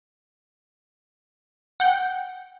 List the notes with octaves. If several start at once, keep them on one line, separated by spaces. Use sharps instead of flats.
F#5 G5